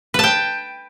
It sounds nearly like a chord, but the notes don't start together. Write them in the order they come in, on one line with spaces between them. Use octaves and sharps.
B4 A5 G5